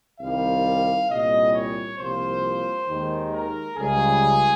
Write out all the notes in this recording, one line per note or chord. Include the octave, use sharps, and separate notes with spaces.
C2 C3 D#3 G3 F5
C2 A#2 G3 C#4 D#5
C#5
C2 C3 F3 A#3 F4 C5
D#2 D#3 G#3
A#4
C#2 C#3 G3 G#4